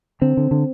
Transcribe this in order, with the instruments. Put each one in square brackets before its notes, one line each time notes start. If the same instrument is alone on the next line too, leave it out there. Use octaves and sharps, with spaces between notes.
[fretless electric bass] D3 C4
D3
D3